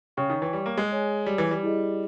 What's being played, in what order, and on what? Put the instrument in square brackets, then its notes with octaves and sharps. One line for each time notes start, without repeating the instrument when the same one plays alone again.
[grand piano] C#3 [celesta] C#5 G5 C#6
[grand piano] D#3
E3
G3
A#3
G#3
[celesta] G#4 C#5 G#5
[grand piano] G3
E3
G3
[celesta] E4 G#4 D#5